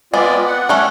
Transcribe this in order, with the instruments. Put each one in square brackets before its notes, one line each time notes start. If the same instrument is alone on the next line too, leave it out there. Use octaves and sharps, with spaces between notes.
[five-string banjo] G#3 B3 [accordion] C4 F4 D5
[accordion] F#5
[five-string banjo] G3 A3 C#4